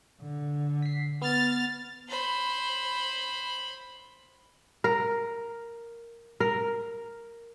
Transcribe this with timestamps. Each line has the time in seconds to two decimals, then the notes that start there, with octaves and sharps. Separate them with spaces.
0.22 D3
0.82 B6 C7
1.22 B3 F6 A6
2.09 C5 B5
4.84 A#4
6.40 A#4